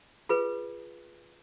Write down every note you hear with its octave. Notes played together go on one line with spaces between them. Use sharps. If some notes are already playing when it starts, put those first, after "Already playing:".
F4 G#4 B4